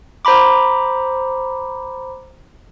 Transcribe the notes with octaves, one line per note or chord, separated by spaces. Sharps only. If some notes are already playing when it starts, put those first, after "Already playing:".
C5 A#5 B5 D6